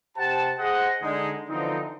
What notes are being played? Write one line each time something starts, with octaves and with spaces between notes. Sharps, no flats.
C3 G4 C5 F#5 A5
G#4 C5 D#5 F#5
D3 G#3 D#4
D3 E3 F3 C4 D#4